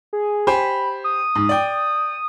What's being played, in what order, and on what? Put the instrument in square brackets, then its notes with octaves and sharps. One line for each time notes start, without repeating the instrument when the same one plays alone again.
[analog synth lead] G#4
[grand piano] G4 C5 G#5 [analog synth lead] B5
[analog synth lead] D#6
[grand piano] G#2
D5 G5